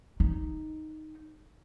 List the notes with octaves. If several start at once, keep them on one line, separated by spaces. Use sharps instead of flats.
D#4